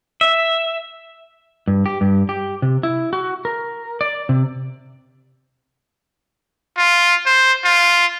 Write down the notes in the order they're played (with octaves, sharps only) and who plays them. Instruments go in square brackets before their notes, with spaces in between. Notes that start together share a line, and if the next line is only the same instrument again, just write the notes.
[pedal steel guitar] E5
[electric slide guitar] G2
G4
G2
G4
C3
E4
F#4
A#4
D5
C3
[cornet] F4
C5
F4